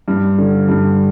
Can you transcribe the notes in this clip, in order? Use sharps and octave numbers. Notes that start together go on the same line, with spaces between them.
G2
D3
G2